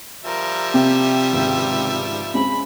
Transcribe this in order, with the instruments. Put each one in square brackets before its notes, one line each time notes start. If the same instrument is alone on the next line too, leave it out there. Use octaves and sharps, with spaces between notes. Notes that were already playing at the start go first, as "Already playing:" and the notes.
[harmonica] F3 G3 E5 [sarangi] A#4
[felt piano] C3 [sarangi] G4
[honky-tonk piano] G#1 C#2 G#2
[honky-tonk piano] C#3 G#3 C4 [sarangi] B5